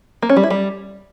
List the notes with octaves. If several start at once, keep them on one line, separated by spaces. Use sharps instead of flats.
A#3
C#4
G3
E4
G3